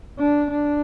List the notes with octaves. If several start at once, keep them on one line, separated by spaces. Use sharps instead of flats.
D4
D4